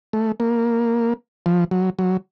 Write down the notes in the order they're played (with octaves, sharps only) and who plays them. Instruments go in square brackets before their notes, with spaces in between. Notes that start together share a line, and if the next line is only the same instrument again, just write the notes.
[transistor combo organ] A3
A#3
F3
F#3
F#3